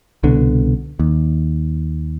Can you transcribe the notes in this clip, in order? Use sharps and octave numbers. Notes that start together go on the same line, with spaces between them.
C2 B2 D3
D#2